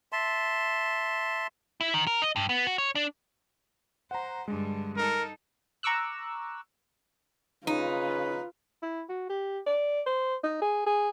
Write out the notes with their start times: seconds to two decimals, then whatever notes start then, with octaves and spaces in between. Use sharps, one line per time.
0.12 E5 A5 C6
1.81 E4
1.94 D#3
2.07 A#4
2.22 D#5
2.36 G2
2.49 B3
2.67 F#4
2.78 C#5
2.95 D4
4.11 C5 F#5 A#5
4.48 G2 D3 G#3
4.97 D#4 A4 A#4
5.83 A#5 C#6 D6 E6 F#6
7.67 C#3 D#4 F4 B4
8.83 E4
9.09 F#4
9.29 G4
9.66 D5
10.06 C5
10.44 D#4
10.62 G#4
10.86 G#4